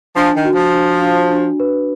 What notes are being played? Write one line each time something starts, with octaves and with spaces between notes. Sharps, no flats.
F3 D4
D#3
F#4
F3
D4
D4
D4
B4